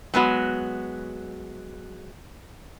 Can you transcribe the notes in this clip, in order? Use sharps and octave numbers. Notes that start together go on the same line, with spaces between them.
F#3 G#3 B3 F#4